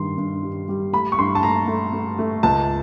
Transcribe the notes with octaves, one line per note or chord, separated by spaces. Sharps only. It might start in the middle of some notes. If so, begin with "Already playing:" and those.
Already playing: G2 D#3 G3 C6
G2
G3
G3
A3 B5
C#6
G2 C6
A5
A3 A#5
A3
A3
A3
C#2 A5